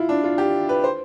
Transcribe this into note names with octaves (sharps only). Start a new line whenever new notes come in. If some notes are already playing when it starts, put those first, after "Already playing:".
Already playing: E4 F4
D4
F4
G4
B4
C5